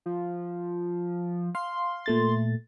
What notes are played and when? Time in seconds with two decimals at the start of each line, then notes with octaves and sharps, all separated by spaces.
0.06 F3
1.55 F5 C6
2.06 A#2 A3 A6